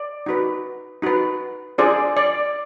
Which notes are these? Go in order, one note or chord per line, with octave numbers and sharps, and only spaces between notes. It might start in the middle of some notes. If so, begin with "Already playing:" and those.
Already playing: D5
D#4 F#4 B4
D#4 F#4 B4
D4 F4 G#4 C5 D5
D5